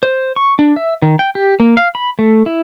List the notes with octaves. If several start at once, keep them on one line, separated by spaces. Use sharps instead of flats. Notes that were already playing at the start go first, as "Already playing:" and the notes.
C5
C#6
D4
E5
D#3
G5
G4
A#3
F5
B5
A3
E4